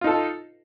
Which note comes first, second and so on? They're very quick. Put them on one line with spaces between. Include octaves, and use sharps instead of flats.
F4 D#4 A4